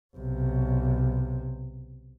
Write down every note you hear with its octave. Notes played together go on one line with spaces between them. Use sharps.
B1 C3